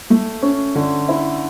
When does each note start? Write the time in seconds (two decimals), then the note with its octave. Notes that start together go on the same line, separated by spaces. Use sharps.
0.10 A3
0.42 C#4
0.75 D3
1.09 E4